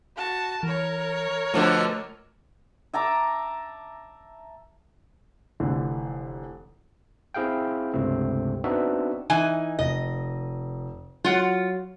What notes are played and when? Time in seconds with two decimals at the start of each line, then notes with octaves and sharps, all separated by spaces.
0.16 F#4 A5
0.63 E3 A#4 C#5
1.54 B2 D3 F3 A3 D6 A6
2.93 E5 A5 A#5 D6
5.60 F1 D3 E3
7.34 C4 E4 G#4 F5 G5
7.93 C#2 G2 C3 A3 C4
8.64 B3 C4 D4 D#4 F#4 E5
9.30 E3 D#4 G#5
9.79 F1 D#5
11.24 F#3 F4 F#5